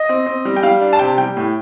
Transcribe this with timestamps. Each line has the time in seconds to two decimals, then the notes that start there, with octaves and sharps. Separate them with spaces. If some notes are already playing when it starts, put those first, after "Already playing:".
Already playing: D#5
0.09 C4
0.26 C4
0.45 G3
0.56 G5
0.63 G3 F5
0.81 D4
0.93 A5
0.99 C3 G5
1.18 G3 G5
1.36 A2